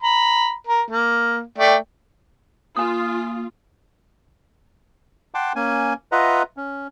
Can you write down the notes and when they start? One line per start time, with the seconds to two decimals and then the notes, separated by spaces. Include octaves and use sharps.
0.03 A#5 B5
0.67 A#4
0.90 A#3
1.58 A3 D5 G5
2.77 A#3 F4 G#5 D#6
5.34 F#5 G5 A5 C6 D6
5.56 A#3 C#4 G#5
6.12 F4 B4 D#5 E5 F#5 A#5
6.57 C#4